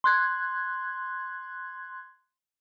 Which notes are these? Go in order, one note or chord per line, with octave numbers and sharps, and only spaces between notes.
C6 F#6 G#6